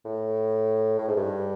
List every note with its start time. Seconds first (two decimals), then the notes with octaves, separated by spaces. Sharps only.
0.05 A2
0.99 A2
1.08 G#2
1.17 G2